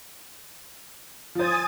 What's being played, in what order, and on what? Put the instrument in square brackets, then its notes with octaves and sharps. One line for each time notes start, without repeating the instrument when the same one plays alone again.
[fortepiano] F3 C5 [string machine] G#5 D#6 A6